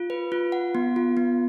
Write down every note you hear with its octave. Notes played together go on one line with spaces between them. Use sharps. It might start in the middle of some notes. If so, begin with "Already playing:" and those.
Already playing: F4
B4
F4
F#5
B3
F4
B3